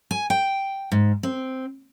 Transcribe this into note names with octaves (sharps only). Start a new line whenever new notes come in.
G#5
G5
G#2
C4